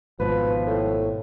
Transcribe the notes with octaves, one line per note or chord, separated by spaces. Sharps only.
G#1 G#2 B2 F3 B4
A2